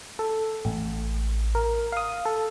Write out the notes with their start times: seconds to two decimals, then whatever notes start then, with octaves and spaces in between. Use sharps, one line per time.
0.19 A4
0.65 A1
1.55 A#4
1.92 F5 D#6
2.25 A4